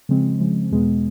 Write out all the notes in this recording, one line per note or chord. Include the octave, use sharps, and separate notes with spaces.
C#3 F3 G#3 C4
C#3 F3 G#3 C4
E2 B2 G#3 B3